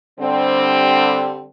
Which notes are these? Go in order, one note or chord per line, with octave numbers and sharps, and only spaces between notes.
D3 G3 C4